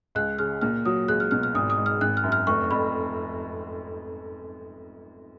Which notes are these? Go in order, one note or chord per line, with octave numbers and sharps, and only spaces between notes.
C#2 F#6
C#3 F6
A#2 F6
F#3 D#6
C#2 F#6
F6
B2 F6
F6
G#1 D#6
D#6
G#2
F6
G#1 F#6
F6
F#2
F6
F1 C#6
F2 B5